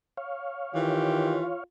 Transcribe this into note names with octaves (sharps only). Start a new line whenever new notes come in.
C#5 F5
D#3 E3 F4 G4